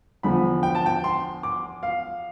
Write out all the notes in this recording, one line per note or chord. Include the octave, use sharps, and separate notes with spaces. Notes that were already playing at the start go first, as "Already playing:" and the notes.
E2 D3 F3 B5
G5
A5
G5
C6
D6
F5